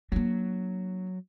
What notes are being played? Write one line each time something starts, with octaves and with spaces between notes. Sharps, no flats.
F#3 A#3 D4